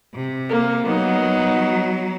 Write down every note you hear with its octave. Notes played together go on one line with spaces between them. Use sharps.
C3
A#3
F#3 B3 D#4